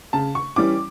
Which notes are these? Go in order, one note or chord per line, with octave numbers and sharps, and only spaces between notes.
C#3 A5
C#6
E3 G3 C#4 E4 D6